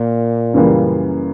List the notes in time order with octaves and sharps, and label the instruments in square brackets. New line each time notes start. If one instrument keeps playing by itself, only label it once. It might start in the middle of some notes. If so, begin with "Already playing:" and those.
Already playing: [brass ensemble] A#2
[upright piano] F#2 C#3 E3 G3 A#3